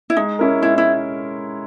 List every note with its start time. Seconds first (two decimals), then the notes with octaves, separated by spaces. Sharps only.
0.10 E4
0.17 G#3 D#4
0.39 C#4 E4 A#4
0.62 G#3 E4
0.78 E4